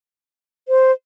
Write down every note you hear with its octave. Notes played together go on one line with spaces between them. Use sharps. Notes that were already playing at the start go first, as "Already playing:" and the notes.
C5